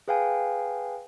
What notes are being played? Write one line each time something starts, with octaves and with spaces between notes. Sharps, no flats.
G#4 B4 F5 G5 G#5